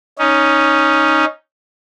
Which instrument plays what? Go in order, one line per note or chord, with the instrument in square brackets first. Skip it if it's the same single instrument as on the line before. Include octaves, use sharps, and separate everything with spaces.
[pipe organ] C#4 D#4